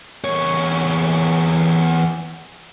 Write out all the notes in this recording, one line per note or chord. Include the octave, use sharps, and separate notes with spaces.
E2 C#5